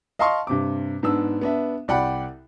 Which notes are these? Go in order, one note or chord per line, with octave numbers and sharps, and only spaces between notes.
D#5 F5 A5 C6 C#6
G2 C3 D6
G#2 B3 D4 E6
B3 D4 E5
C2 D5 F#5 G5 B5